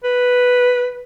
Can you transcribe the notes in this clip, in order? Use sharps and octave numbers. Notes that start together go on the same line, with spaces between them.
B4